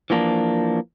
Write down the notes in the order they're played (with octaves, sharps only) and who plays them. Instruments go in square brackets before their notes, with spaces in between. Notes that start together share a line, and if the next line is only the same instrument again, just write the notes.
[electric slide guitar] E3 F3 A#3 D4